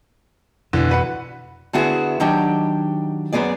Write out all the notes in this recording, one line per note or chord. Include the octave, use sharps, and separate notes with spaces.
F2 B2 D3 E3
F#4 B4 F#5
D3 B3 E4 F#4 G#4
D#3 F#3 D4 G4
F#2 C3 B3 G#4 D5